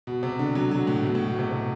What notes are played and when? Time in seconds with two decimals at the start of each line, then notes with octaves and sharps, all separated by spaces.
0.07 B2
0.23 C3
0.39 D3
0.55 F#3
0.71 F#3
0.87 A2
1.03 B2
1.15 A2
1.27 B2
1.39 C3
1.51 C3